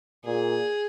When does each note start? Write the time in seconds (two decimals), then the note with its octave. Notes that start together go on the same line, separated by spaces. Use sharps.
0.25 A#2 G#4